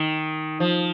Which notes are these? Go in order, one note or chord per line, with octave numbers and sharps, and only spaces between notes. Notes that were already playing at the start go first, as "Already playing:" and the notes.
Already playing: D#3
F3